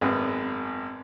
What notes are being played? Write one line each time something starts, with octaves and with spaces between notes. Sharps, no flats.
G#1 F#2 B3 G#4